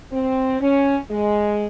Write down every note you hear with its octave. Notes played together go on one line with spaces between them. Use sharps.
C4
C#4
G#3